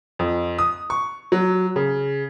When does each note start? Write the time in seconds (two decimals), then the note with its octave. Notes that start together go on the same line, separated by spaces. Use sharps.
0.19 F2
0.59 D#6
0.90 C#6
1.32 F#3
1.76 C#3